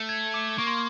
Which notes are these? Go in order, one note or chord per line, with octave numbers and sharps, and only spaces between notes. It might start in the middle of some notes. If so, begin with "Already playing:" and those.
Already playing: A3
G#6
D6
A#3 C#6
C6